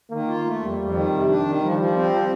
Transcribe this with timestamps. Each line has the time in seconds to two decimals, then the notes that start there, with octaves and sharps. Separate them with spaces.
0.11 D#3 A#3
0.28 F4
0.45 A3
0.62 F2 G3
0.78 F2
0.94 D#3
1.12 C3
1.29 D4
1.45 D#3
1.62 F3 G3
1.79 F3
1.96 C4
2.11 F3